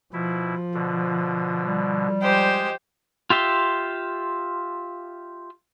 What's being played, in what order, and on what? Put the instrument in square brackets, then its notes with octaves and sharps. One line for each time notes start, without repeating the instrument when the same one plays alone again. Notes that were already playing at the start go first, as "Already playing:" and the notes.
[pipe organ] B2 E4 [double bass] F3
[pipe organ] B2 D3
[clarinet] G3
[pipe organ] G#3 [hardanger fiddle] G4 C5
[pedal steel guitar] F4 G4 E5 C6